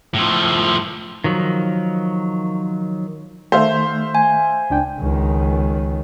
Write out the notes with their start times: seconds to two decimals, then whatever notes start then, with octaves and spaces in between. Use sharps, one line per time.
0.14 A2 F3
1.24 D#3 F3 F#3
3.52 D#3 A3 C5 E5 F5
4.15 G#5
4.70 C#2 D4 G5
5.01 C#2 D#3